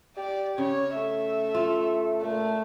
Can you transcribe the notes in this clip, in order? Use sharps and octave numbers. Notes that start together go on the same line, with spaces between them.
G4 D5
C#3 C#5
A3 E5
F4
A#2 A3